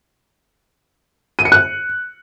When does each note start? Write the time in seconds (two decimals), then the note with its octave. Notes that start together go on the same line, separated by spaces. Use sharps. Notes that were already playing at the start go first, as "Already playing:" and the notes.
1.39 D#7
1.45 C#7
1.52 F#6